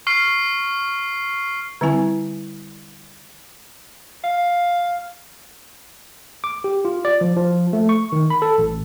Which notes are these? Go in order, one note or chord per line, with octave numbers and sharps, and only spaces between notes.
C#6 F6 C7
D3 G3 C4 E4 G#5
F5
D6
G4
F4
D5
F3
F3
A3
C#6
D#3
B5
A4
A1